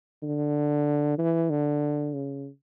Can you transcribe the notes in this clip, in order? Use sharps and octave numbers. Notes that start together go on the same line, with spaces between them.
D3
E3
D3
C#3